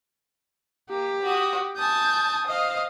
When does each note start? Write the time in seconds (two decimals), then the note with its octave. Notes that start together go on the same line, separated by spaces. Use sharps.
0.90 A#3 G4
1.22 F#4 D#6
1.77 G#5 A5 D#6 G6
2.47 C5 D#5 F5